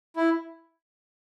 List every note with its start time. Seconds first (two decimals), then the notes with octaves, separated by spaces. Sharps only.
0.17 E4